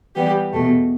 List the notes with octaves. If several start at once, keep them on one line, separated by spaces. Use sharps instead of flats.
E3 G3 B3 G4
E2 B2 A3